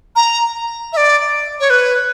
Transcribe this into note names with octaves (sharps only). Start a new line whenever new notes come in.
A#5
E5
D5
C#5
B4